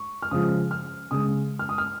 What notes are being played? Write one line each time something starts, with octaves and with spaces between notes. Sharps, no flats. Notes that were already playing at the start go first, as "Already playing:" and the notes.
Already playing: C#6
F6
C#3 F3 G#3 D#6
F6
C#3 G#3 D#6
F6
D#6
F6